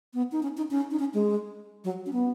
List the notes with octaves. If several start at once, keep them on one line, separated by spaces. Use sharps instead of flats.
B3
D#4
C#4
D#4
C#4
D#4
C#4
G#3
F#3
C#4
B3